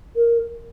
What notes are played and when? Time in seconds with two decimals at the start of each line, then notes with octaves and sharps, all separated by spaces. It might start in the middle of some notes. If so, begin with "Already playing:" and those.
0.16 A#4